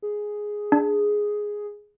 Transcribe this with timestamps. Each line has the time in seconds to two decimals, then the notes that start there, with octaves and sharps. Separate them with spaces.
0.02 G#4
0.72 D4